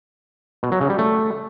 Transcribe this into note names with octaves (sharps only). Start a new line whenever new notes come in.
B2
F#3
C#3
G3
A3